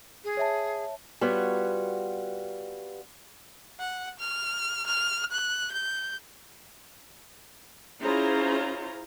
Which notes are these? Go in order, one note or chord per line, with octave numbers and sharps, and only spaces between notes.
G#4
C#5 E5 A5
G3 B3 F4 F#4 C#5
F#5
F6
F6
F#6
G6
C#4 E4 F4 G#4 C5 A#5